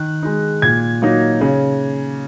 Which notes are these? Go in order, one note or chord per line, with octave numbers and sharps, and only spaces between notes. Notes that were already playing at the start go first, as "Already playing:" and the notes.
Already playing: D#3 F#6
G#3 D#4
A#2 G#6
F#3 A#3 D#4
C#3